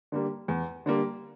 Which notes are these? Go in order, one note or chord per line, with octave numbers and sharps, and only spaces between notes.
D3 G3 A#3
E2
D3 G3 A#3